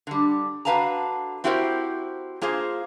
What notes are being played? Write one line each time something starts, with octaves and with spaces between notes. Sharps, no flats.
D3 G3
D3 F#4 B4 F5 A5 A#5
C4 E4 F#4 G4 A#4 C5
A#3 F4 G#4 C5